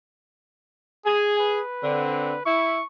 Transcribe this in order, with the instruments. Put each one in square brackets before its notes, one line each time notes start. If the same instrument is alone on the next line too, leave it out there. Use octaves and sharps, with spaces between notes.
[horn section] G#4 [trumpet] G#5
[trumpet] B4
[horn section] D3 C4
[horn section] E4 [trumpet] C#6